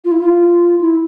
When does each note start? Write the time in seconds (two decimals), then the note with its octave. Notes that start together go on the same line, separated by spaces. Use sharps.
0.05 F4
0.11 E4
0.20 F4
0.81 E4